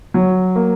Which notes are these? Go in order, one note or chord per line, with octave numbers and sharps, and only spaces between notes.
F#3
A#3